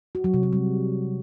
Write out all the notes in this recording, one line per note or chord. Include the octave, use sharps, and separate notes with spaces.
F#4
F#3
C3
F#3
G3